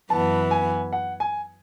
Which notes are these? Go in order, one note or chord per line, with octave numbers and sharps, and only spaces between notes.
F#2 E3 B3 A5
G#5
F#5
G#5